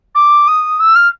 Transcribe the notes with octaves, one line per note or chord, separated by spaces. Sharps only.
D6
D#6
E6
F6